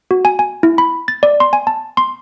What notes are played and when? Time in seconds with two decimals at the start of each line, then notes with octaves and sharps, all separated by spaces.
0.11 F#4
0.25 G#5
0.39 G#5
0.63 E4
0.78 B5
1.08 A6
1.23 D5
1.40 C6
1.53 G#5
1.67 A5
1.97 C6